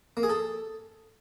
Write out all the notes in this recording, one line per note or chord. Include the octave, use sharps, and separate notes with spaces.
A#3
G#4
A4